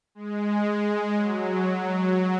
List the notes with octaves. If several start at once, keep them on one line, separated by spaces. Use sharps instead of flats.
G#3
F#3